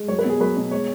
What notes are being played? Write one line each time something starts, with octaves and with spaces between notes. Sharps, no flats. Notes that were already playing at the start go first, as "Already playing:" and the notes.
Already playing: G#3
F#3 C#5
B4
B2
G#4
F#3 B4
B2
G#3 C#5